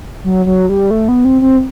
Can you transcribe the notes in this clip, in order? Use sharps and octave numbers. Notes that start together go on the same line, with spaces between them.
F#3
F#3
G3
A3
B3
C4
C4